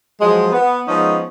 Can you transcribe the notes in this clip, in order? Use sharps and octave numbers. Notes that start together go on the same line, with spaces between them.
F3 F#3 G#3
B3
F3 G#3 B3 C#4 D#4